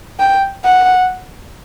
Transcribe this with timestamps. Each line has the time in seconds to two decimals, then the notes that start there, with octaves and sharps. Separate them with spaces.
0.20 G5
0.65 F#5